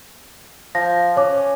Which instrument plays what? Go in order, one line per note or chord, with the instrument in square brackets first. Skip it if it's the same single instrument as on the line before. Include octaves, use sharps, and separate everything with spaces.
[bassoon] F3 [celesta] A#6
[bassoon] C#4 [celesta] C#5 D6